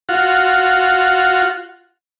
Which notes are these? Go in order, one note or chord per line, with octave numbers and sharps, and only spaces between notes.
F4 F#4